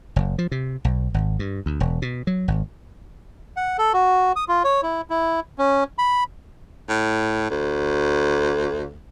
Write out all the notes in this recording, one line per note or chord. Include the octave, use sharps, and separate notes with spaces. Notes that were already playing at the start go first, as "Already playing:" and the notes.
F#1
F3
C3
B1
G#1
G2
D2
E1
B2
F#3
G#1
F#5
A4
F#4
D#6
F4
C#5
E4
E4
C#4
B5
A2
D2